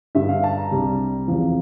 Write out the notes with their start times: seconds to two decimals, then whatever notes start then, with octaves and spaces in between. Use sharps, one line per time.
0.15 G2 D3 G3 E5
0.29 F5
0.44 A5
0.57 A#5
0.71 C2 C3 G3
1.28 E2 C3 F3